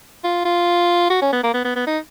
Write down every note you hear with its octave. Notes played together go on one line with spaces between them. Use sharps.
F4
F4
F#4
C#4
B3
A#3
B3
B3
B3
D#4